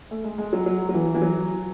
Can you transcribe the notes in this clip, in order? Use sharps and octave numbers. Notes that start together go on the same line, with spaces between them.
A3
G#3
G#3
F#3
F#3
F#3
E3
E3
F#3